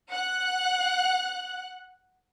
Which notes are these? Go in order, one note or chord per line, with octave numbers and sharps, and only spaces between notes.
F#5 F#6